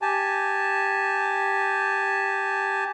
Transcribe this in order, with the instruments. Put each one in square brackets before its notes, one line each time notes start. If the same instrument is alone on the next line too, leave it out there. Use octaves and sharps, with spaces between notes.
[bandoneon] G4 G#5 A5